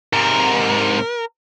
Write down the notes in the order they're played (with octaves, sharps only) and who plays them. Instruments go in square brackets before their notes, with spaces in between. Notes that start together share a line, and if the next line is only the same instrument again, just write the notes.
[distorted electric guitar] G#2 C3 [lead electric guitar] A#4